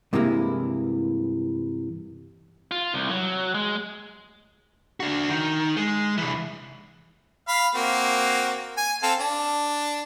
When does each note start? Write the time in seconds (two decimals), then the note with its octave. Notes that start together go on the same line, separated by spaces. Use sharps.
0.13 G2 C3 E3 G#3 A#3 E4
2.71 F4
2.94 C2
3.10 F#3
3.55 G#3
5.00 D4 F#4
5.29 D#3
5.77 G#3
6.18 C2 E3
7.48 F5 B5
7.75 A#3 C4 F#4
8.77 G#5
9.03 C4 A4 F5
9.20 D4